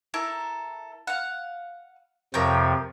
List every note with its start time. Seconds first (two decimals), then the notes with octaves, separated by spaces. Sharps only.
0.14 E4 A4 A#4
1.07 F5 F#5
2.34 F2 C3 F3 A#4 C#5 G5